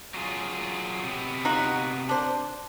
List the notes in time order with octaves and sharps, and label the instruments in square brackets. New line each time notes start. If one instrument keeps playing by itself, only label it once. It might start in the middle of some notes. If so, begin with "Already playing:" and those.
[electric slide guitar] F#3 F4 G#4
C3 B3
[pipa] D#4 F4 F#4
D4 C5